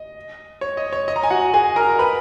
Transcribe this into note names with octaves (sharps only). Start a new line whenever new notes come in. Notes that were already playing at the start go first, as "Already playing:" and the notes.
Already playing: D#5
C#5
D#5
C#5
D#5
A#5
G#5
F#4 F#5
G#4 G#5
A#4 A#5
A#5
B4 B5